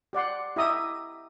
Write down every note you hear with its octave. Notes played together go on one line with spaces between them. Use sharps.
G4 D5 F#5 C6
E4 G4 D#5 E5 A#5 D#6